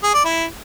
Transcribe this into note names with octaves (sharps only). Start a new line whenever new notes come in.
G#4
D5
E4